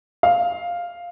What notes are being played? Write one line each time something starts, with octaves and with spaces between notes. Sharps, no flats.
F5